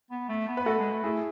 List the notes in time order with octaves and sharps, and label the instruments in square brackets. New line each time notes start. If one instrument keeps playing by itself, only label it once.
[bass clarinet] B3
A3
B3
[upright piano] B4
[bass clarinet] A3 [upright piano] F#4 A4
[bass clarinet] G#3
A3
[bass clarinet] A3 [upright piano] E4 G#4